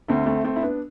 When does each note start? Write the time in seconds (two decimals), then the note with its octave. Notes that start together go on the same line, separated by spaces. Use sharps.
0.08 D2 D3 A3 C4
0.26 A3 C4
0.44 A3 C4
0.56 E4
0.62 B3 D4